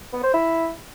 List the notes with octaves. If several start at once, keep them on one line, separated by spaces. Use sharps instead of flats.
B3
C5
E4